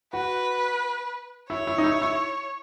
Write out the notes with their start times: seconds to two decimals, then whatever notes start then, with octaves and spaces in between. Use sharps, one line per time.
0.13 F#4 B4
1.50 E4 C#5
1.67 E4
1.78 D#4
1.84 E4
2.02 E4